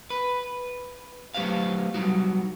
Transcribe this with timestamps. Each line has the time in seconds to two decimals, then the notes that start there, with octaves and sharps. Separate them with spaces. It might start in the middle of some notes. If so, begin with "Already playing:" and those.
0.10 B4
1.34 F#3 A3 G4 B4 C5 F5
1.94 F#3 G3 D#4 F#4